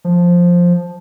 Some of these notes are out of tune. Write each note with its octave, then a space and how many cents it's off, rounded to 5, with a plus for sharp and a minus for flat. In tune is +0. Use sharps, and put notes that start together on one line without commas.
F3 +5